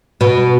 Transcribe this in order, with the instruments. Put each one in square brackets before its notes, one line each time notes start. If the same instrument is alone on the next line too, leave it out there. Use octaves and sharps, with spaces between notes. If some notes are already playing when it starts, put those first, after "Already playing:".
[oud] B2